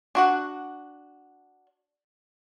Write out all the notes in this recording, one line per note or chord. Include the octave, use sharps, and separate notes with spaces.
D4 F#4 F#5